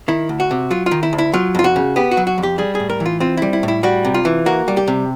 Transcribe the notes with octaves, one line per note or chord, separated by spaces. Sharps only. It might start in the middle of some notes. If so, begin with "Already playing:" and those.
D#3 E4
D2
F#4
C3
F#3 F4
F4
D#3
E4
D2
E4
F#3 F4
F2 F4
F#4
C#3
B3 G4
F#4
F#3
F#4
F2
G4
G3 G#4
A2 G#4
A#4
E3
F4
C4 F4
G3 E4
E4
A2
E4
G3 F#4
C3
F4
E3
A#3 F#4
G3
G4
C3